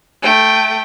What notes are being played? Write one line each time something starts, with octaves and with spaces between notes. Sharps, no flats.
A3 G5